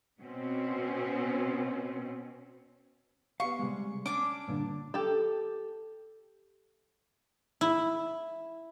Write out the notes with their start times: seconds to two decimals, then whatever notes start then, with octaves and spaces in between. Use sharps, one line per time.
0.21 B2 C4 C#4
3.40 B3 G4 F5 C#6
3.59 C3 G3 G#3
4.06 C#4 D4 D6
4.48 G2 A#2 D3
4.94 G4 A4
7.61 E4